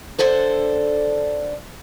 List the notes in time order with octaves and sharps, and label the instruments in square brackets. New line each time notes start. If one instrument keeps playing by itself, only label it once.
[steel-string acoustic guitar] D3 D4 A4 C5